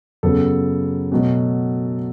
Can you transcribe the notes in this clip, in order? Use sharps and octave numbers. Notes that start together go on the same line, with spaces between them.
F#2 C#3 F#3 B3 A4
B2 F#3 A3